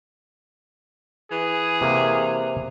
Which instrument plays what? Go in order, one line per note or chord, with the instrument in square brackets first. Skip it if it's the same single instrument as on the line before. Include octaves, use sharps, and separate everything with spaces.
[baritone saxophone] E3 [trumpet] G#4
[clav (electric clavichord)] C3 A#3